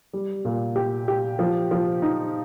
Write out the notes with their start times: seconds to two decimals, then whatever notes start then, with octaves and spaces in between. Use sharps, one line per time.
0.13 G3
0.45 A#2
0.76 G4
1.08 G4
1.39 F3
1.71 F3
2.02 D#4